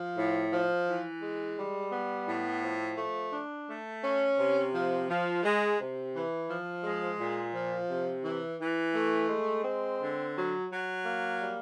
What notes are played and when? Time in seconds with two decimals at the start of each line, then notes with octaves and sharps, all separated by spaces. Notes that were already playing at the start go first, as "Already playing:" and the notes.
Already playing: F3
0.16 A2
0.52 F3
0.87 E3
1.23 G#3
1.57 G3
1.93 B3
2.27 A2
2.62 F3
2.98 A3
3.33 D4
3.68 A3
4.03 C#4
4.38 C3
4.73 F3
5.08 F3
5.43 G#3
5.79 C3
6.14 E3
6.49 F3
6.84 G#3
7.19 A#2
7.54 F3
7.89 C3
8.24 E3
8.59 E3
8.94 A3
9.29 G#3
9.65 C4
10.00 D3
10.35 F#3
10.70 F#3
11.05 A#3
11.40 G3